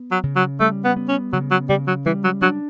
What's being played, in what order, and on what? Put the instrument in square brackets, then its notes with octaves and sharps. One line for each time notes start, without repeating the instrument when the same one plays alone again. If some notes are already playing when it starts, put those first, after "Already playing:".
Already playing: [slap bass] B3
[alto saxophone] F#3
[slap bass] C#3
[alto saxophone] F#3
[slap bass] G3 [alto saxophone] A3
[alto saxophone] B3
[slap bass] B3
[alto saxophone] C#4
[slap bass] C#3 [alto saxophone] F#3
[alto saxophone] F#3
[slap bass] C#3 [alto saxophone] G3
[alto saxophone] F#3
[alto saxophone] E3 [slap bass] G3
[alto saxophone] F#3
[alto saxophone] F#3 [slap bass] D4